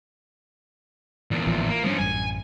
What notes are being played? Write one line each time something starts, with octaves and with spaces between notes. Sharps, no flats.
E2 A#2
A1 E3 F3
A#3
F3 G3 A#3 C#4 D4
A1 F#2 G3 G#5